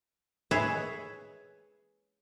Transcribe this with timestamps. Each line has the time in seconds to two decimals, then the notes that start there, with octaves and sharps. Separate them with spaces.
0.51 G#4 B4 C#5 E5